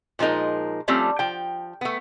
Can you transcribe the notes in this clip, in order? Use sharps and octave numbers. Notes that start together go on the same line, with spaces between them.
A#2 F3 G#3 D#4 A#4
F3 G3 A3 C4 C#4
F3 G5
A3 B3